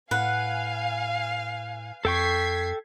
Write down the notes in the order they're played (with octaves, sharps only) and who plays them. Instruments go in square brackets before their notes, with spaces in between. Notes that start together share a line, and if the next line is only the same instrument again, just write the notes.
[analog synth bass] A2 [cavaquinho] B4 F#5 [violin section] F5 G#5
[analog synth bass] F2 [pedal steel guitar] A4 G5 C#6 [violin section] G#6 B6 C7